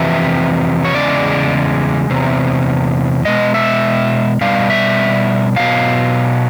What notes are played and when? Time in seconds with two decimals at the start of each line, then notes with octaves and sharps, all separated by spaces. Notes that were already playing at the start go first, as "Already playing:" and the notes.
Already playing: F2 C3 E3 E5
0.85 C#5
0.94 E2 C#3 G#3 D5
2.10 E2 C3
3.25 B2 G#3 D#5
3.54 E5
4.41 B2 G3 F5
4.70 E5
5.56 B2 F#3 F5